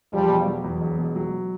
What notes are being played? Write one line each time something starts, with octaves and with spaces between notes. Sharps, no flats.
E1 F3 G3
B2
F#3
E2
E1
B2
F#3